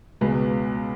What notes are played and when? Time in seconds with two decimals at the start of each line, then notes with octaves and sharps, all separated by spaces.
0.21 C#2 B2 G#3 B4